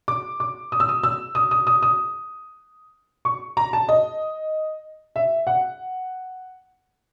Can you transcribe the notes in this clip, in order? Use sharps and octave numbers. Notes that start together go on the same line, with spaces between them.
D6
D6
D#6
E6
D#6
E6
D#6
D#6
D#6
D#6
C#6
A#5
A5
D#5
E5
F#5